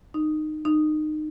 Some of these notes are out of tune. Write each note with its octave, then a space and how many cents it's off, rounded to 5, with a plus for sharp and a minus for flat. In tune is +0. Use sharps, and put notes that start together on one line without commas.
D#4 -20
D#4 -25